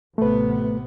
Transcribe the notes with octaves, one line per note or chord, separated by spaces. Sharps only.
A1 C3 A3 B3 B4